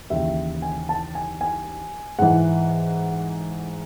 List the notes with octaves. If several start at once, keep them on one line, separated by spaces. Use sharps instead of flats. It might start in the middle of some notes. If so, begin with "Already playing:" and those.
D#2 C#3 E3 E5
G#5
A5
G#5
G#5
G#2 E3 F#5